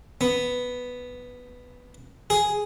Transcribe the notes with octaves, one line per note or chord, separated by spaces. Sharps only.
B3
G#4